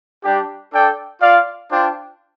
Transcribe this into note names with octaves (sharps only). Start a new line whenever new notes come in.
G3 D4 G4
D4 A4 D5 G5
F4 D5 F5
D4 F4 C5 G5